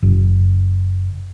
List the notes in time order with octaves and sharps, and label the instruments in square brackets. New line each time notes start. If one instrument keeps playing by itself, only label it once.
[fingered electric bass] F#1